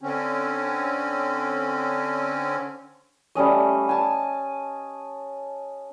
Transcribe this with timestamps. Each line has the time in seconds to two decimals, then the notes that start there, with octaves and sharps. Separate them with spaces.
0.01 D3 C4 C#4
3.35 G3 A3 C#4 D#5
3.89 G#5 A5